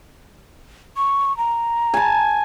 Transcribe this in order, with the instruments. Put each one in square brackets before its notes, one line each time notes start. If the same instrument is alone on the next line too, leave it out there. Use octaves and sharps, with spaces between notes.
[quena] C#6
A#5
[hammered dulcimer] G#5 A5